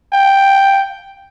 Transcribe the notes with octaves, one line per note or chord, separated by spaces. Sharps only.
G5